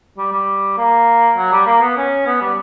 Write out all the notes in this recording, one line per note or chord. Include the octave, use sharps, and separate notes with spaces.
G3
G3
A#3
F#3
G3
A#3
B3
C#4
B3
G3